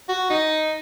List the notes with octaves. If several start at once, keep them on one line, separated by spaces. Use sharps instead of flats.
F#4
D#4